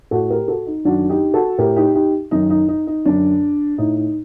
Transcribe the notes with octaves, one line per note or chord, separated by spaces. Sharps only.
A2 F#4 A4
G4 A#4
F#4 A4
D#4
F#2 D#3 D4 F#4
D#4 G4
F#4 A4
A2 G4 A#4
D#4 G4
D#4 G4
F#2 D#3 D#4
D#4
D#4
D#4
F#2 D3 D4
A2 D#4
D#4